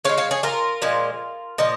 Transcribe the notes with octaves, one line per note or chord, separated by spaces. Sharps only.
C#3 G#3 C#5 F5
C#5 F5
G#4 C#5
F4 A#4
A#2 F3 G#3
A#2 F3 D#5